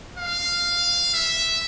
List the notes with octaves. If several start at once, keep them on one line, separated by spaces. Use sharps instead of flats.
F5
E5